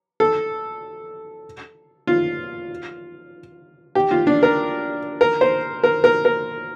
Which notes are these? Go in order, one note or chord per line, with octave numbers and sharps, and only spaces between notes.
A4
F4
G4
F4
D4
A#4
A#4
C5
A#4
A#4
A#4